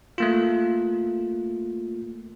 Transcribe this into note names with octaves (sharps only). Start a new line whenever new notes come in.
A3 A#3 F4